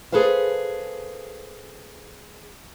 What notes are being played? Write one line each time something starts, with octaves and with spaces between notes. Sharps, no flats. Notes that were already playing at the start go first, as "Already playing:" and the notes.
G#4 A4 B4 C5 F5